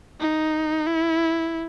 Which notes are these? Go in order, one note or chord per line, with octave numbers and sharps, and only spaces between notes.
D#4
E4